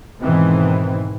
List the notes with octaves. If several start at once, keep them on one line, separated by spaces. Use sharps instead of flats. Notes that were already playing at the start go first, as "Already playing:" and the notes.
G#2 B2 D#3 E3 C4